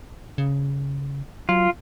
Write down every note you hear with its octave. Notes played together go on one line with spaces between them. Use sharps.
C#3
F#3 F4